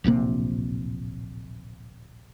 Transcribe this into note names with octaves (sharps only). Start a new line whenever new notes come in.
D1 A#1 C3 A#3